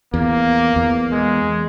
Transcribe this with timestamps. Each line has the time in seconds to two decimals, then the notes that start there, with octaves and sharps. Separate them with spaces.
0.14 E2 A#3
0.76 E2
1.12 G#3